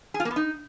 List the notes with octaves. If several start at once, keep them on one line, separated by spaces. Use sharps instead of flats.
G#4
F4
A#3
B3
D#4